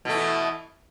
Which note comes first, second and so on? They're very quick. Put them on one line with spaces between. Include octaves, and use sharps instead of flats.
B2 A3 E3